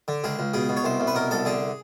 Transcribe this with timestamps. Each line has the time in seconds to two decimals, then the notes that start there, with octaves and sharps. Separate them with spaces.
0.08 D3
0.24 C#2 G#4
0.39 C#2
0.54 B2 G#4
0.69 B2
0.77 C#5
0.84 C2 C5
1.00 C2
1.07 B4
1.15 B2 A#4
1.31 C2 A4
1.45 D3 G#4